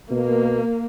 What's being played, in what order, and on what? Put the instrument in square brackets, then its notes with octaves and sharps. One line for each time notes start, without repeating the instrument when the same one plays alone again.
[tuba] B2 [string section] A#3